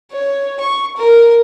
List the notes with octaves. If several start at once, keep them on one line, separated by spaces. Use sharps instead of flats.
C#5
C#6
A#4